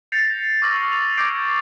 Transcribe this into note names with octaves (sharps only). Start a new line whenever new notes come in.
G6 A6 A#6 C7 C#7 F7
C#6 D6 E6 F6 A#6 F#7
F7
D6 G6 G#6 A#6 C7 D7